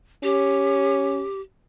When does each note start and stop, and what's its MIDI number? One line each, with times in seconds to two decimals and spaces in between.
0.23 1.24 61
0.23 1.41 67